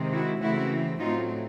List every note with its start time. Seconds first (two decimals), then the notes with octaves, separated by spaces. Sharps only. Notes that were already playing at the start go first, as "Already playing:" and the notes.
Already playing: C3 D#3 G#3 C4
0.13 E4 F#4
0.42 C#3 E3 A3 C4 E4 F#4
1.00 A2 F#3 A3 C4 D#4 F4